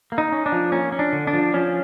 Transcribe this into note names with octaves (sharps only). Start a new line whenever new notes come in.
A#3
D#4
C#4
D4
F3
A#3 C#4
C#4
D4
D3
D4
F3
F3 C#4